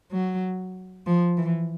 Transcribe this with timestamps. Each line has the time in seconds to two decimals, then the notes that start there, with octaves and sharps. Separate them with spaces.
0.12 F#3
1.06 F3
1.38 E3